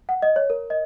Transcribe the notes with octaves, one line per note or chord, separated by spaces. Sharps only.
F#5
D#5
C#5
A#4
D#5